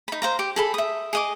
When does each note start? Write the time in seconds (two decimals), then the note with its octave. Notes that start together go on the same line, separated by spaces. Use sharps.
0.08 D#4 B5
0.22 C5 F5 A#5
0.39 G4
0.56 G#4 A4 B5
0.74 E5 D#6
1.13 G#4 D#5 D6